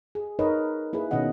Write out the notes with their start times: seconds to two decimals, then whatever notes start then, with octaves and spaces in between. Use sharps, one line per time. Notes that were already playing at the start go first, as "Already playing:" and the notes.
0.15 G#4
0.39 D#4 A#4 B4 C#5 D#5
0.93 A#3 E4 G#4 B4
1.11 B2 D#3 C#4 D#5 F#5